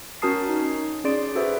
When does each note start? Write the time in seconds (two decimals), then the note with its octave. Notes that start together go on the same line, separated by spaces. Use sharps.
0.22 C#4 F#4 A#4 A5 D#6 C7
0.49 D#4
0.62 C#4
1.04 C#4 G#4 D5 C6 D7
1.35 F#4 G#4 A4 B4 C5 E5